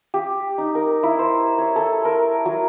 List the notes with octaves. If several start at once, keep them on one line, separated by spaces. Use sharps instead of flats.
G4
D#4
A#4
E4
C5
C#5
A4
A#4
F#3